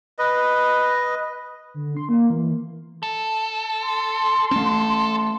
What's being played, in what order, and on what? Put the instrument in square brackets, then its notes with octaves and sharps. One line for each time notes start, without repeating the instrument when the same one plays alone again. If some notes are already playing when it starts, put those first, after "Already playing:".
[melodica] B4 D#5
[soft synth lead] D3
C6
A#3
E3
[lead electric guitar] A4
[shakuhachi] C6
[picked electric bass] A3 C#4 [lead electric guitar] A4